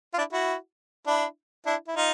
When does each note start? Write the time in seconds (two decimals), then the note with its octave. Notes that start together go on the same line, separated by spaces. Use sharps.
0.14 F4
0.18 D4 E4
0.32 E4 F#4
1.07 D4 E4
1.66 D4 E4
1.88 E4
1.96 D#4 F4